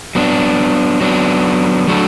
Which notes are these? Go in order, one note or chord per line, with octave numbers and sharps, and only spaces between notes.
F#3 B3 D4
F#3 B3 D4
F#3 A3 D4 F#4 A4